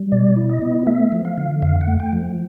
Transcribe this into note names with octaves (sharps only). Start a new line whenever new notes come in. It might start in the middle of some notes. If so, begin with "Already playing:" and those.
Already playing: G3
B2 D5
E4
D#5
B3
A3 E5
F3
F5
D3
F2 F5
F#5
A3
G5
F3